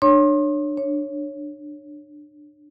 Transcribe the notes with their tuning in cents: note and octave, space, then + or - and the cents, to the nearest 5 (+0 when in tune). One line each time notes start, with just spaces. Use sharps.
D4 +25 C#5 +0 C6 +35
D4 +0 C#5 -5